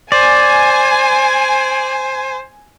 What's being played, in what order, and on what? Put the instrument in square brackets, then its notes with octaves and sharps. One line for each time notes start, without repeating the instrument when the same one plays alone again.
[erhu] C5 [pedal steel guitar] D5 [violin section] G#5